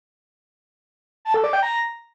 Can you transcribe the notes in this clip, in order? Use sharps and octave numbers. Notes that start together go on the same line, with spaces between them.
A5
A4
D5
G5
A#5